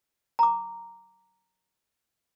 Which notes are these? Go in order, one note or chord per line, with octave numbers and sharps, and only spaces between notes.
A#5 D6